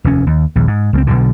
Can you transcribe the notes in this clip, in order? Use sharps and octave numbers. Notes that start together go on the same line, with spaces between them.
F1 D#2 C#4
D#2
A#1 D#2
G#2
C#2 G#3 C4
B1 B2 D3